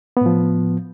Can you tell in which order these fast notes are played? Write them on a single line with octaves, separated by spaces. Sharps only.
B3 A2 F3